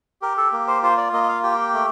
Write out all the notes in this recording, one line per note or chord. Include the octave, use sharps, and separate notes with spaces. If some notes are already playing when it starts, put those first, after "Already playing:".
G4 A#4
A4
A#3
C5
F4 C5
D5
A#3 D#5
D#5
F5
G4 G5
A3